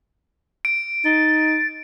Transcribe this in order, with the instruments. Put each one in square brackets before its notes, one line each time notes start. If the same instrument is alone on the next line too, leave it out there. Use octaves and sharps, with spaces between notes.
[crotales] D7
[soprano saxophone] D#4 [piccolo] A6